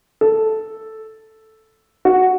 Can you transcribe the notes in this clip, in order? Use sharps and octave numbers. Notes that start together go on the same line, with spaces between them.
A4
F#4